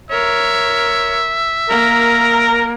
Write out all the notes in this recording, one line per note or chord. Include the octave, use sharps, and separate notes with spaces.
A#4 C#5 E5
A#3 A#4